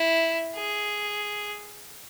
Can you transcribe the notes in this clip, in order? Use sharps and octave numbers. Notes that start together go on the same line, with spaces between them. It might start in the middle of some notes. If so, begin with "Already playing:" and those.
Already playing: E4
G#4